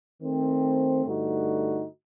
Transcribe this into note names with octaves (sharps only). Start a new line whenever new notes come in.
D#3 A3 C4
G2 D3 A3 D#4 F#4